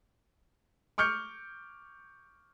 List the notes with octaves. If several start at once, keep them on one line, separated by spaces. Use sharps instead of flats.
C#6 D6 F6 G6 C#7